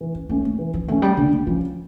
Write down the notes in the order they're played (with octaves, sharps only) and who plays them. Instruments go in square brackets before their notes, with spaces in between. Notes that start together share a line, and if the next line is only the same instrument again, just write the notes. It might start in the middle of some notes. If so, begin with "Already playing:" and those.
[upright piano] E3
[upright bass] C#4
[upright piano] A3 C#4 [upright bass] A#3
[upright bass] A3
[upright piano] E3
[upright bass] F3
[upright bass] E3 [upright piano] A3 C#4
[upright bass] G3
[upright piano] D3 [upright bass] A#3
[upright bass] A3
[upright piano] F3 C#4 [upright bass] G3